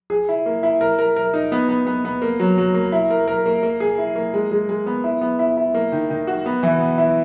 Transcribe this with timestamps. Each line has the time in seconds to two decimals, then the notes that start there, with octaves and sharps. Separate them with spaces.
0.10 G#4
0.29 E4
0.46 A#3
0.63 E4
0.81 A#4
0.99 A#4
1.16 A#4
1.34 D#4
1.52 B3
1.69 B3
1.87 B3
2.05 B3
2.22 A#3
2.40 F#3
2.58 F#3
2.74 A#3
2.92 E4
3.11 A#4
3.28 A#4
3.46 A#3
3.63 A#3
3.80 G#4
3.98 E4
4.15 A#3
4.34 G#3
4.51 G#3
4.69 G#3
4.86 B3
5.04 E4
5.21 B3
5.39 E4
5.57 E4
5.74 A#3
5.92 D#3
6.10 D#3
6.27 F#4
6.46 B3
6.63 E3
6.80 B3
6.98 E4